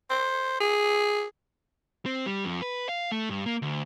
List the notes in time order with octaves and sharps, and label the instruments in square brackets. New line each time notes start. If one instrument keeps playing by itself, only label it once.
[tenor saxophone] C5
G#4
[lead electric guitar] C4
G3
F2
B4
F5
A3
G2
A#3
D2